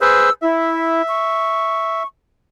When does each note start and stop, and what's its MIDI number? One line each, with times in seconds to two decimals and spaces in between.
0.01 0.30 68
0.01 0.30 71
0.01 0.30 72
0.01 0.32 88
0.42 1.02 64
0.42 2.03 76
1.08 2.06 85